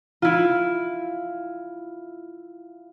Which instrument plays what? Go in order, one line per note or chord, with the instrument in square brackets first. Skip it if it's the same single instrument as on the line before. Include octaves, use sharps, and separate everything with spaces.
[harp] E4 F4